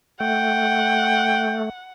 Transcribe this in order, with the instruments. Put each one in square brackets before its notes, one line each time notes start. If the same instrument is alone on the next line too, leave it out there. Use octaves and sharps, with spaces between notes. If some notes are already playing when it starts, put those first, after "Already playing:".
[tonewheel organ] A3 [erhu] F#5 [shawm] G5